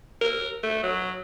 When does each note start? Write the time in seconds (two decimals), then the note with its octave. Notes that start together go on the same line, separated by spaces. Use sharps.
0.21 A#4
0.63 A3
0.83 F#3